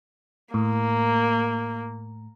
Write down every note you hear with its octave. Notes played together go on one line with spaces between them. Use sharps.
A2 A#3